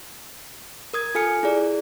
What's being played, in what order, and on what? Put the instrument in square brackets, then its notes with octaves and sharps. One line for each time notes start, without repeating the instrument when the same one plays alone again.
[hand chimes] A#4 D#6 G#6
F4 A4 G#5 F6 C#7
E4 G#4 D5